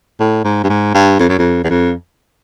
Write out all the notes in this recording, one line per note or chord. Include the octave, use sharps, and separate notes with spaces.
A2
G#2
G2
G#2
G2
F2
F#2
F2
E2
F2